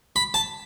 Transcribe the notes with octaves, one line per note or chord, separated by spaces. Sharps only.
B5
A5